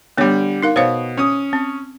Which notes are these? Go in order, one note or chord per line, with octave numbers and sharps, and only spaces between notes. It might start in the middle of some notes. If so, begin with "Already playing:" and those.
D3 G3 B3 C#5
D#4 A#4 F5
B2 C5 C#5 F5
C#4 D#6
C4